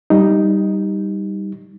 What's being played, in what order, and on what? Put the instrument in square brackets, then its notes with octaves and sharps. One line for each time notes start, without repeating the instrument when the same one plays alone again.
[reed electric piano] G3 D#4